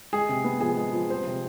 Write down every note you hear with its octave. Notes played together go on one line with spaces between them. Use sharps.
G#3 G#4
C3
B3
F3 G#4
G#3
F3
G3 C5
C3